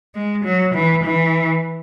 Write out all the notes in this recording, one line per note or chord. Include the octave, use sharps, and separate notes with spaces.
G#3
F#3
E3
E3